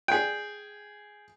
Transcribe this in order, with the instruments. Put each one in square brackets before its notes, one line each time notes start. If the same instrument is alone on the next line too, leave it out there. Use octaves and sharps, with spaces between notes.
[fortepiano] G#4 G5